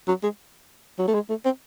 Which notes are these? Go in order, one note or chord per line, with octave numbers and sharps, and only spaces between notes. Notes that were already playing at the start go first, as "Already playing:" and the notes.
F#3
G#3
F#3
A3
G#3
A3
C4